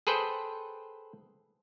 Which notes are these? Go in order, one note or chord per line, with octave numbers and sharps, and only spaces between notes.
G#4 A4 B4 C5 G5